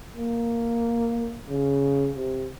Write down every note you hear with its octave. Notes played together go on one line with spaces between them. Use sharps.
A#3
C#3
C3